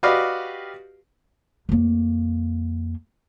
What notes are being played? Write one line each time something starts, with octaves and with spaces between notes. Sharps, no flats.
F#4 G4 B4 D5 D#5 F5
F2 A#3